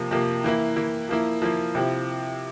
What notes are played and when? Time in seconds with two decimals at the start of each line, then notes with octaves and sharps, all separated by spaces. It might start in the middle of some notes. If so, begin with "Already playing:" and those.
Already playing: C3 F3 A#3
0.11 C3 F3 A#3
0.44 E3 A#3 E4
0.76 E3 A#3 E4
1.09 F3 A#3 E4
1.42 F3 A#3 E4
1.75 C3 F3 C4 E4